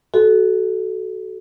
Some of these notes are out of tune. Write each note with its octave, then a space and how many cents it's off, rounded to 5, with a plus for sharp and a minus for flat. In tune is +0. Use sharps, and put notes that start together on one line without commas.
F#4 +20 A4 -20